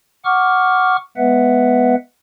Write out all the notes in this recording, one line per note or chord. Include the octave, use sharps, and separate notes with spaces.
F#5 C#6 D6 F6
G#3 B3 B4 E5 F#5